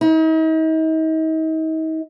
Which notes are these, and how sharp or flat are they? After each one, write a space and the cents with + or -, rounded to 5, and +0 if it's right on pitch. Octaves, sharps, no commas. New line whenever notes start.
D#4 +40